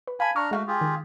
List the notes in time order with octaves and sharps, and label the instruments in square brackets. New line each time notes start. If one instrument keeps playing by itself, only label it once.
[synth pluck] B4
[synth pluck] F5 A5 [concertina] G#5 B5
[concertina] D4 A#5 F6 [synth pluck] C#6
[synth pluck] G#3 F5 F6 [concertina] A3 F#4
[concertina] F4 G4 G#4
[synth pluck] D#3